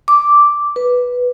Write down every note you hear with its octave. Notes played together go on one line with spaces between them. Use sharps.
D6
B4